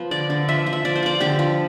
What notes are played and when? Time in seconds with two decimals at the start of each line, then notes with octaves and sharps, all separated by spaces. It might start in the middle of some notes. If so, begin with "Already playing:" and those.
Already playing: F3 B3
0.11 D3 D5
0.30 D3
0.48 F3 E5
0.66 F3
0.73 E5
0.85 F3 D5
0.95 C5
1.03 F3 D5
1.20 D3 G4
1.39 F3